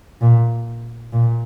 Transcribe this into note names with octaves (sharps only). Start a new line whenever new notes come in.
A#2
A#2